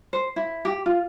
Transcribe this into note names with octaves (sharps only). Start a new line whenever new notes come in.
C5
E4
G4
F4